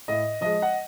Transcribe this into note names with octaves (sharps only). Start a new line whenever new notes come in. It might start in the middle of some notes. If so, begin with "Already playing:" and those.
A2 D#5
F3 G#3 D#5
F#5